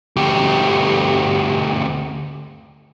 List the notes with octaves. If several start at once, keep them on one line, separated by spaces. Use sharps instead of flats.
D2 G4